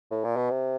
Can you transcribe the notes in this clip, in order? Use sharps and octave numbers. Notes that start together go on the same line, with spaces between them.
A2
A#2
B2
C3